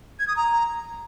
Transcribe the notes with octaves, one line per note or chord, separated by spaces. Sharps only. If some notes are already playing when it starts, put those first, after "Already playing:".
G#6
D#6
A#5